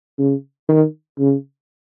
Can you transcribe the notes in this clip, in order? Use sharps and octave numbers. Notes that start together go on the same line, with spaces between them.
C#3
D#3
C#3